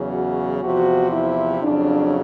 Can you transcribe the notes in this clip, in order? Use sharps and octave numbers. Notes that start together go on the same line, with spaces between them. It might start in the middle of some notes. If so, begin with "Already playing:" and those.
Already playing: E2 C#3 F#3
F#4
E2 C3 F3 F#4
E4
F2 C#3 F#3 D4